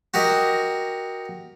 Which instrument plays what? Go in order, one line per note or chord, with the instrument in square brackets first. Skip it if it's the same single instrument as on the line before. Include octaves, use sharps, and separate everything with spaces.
[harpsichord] F#4 G4 A#4 D#5